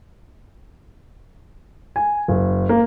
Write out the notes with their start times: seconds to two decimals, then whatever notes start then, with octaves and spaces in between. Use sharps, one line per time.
1.96 G#5
2.28 F#1
2.69 A#3